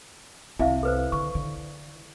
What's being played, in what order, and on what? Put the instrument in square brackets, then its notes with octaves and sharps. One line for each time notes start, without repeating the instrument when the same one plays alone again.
[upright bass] C2 C4 [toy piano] E4 E5 F5
[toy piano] A4 B4 C5
[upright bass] D3 [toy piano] C#6
[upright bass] D3